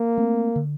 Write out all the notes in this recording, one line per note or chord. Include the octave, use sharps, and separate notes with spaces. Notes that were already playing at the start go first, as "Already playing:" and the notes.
Already playing: A#3
A3 C4
D3